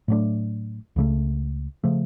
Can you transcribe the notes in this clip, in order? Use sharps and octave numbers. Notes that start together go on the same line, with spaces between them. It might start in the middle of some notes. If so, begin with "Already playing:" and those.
A2 F#3 A3 D4
C#2 C#3 F3 A3
C#3 F3 A3